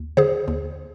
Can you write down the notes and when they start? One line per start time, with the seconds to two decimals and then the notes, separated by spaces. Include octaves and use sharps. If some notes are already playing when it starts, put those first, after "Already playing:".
Already playing: D#2
0.17 D3 G#4 C5
0.48 D#2